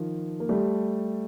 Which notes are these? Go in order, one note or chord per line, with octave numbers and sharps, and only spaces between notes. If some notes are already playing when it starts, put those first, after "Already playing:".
Already playing: D#3 F3
A#3
G3 A3